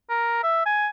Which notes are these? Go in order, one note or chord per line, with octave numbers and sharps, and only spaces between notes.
A#4
E5
G#5